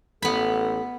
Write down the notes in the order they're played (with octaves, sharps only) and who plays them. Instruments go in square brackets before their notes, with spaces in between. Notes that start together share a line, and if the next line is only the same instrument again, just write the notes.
[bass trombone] A1 [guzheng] B3 B5 [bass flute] A4